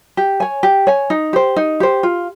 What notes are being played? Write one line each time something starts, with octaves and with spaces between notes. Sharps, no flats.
G4
C#5 G#5
G4
C#5 G#5
D#4
G4 C5
D#4
G4 C5
F4